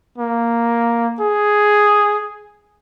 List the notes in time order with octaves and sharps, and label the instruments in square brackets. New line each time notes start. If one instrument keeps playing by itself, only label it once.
[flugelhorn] A#3
G#4